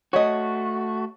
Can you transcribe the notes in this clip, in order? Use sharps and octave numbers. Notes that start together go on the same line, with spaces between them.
A3 F#4 C#5 D#5